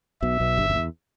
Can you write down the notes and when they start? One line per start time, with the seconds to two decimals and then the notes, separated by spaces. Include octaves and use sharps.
0.22 B1 B2 E5
0.40 B1 B2
0.58 G1 G2
0.70 F#2
0.75 E2